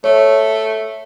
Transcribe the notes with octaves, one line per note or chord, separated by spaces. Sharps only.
A3 C#5